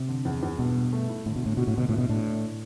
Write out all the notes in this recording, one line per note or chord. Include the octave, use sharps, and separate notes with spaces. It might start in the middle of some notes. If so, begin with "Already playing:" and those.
Already playing: C3
D3
E2
E2
G2 B2
G2
A3
E4
A2 D3
B2
A2 D3
B2 F#4
A2
B2 D3
A2 E3
B2
A2 D4